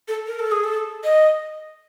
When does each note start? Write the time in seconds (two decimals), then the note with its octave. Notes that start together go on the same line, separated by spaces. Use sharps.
0.08 A4
0.27 A#4
0.39 A4
0.52 G#4
0.64 A4
1.04 D#5